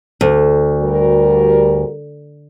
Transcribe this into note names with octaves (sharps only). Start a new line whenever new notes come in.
D2
G3 F#4 A#4